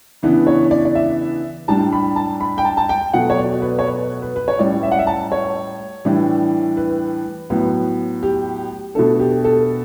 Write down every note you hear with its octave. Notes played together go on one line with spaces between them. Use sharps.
C#3 E3 B3 D4
C#5
D5
D5
E5
A2 G3 D4 A5
B5
A5
B5
G5
A5
A5
G5
B2 F#3 A3 F#5
C#5
D5
B4
C#5
B4
B4
B4
C#5
A2 G3 C#4 D5
E5
F#5
E5
A5
C#5
A2 E3 G3 D4
B4
A2 F#3 B3
G4
B2 A3 D4 A4
G4
A4